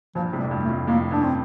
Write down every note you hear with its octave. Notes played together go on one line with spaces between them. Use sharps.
G2 A#2 F3
A2 C3
G3
F2
G2
A3
F2 A2
F2 A2 A#3
G2 D4
C4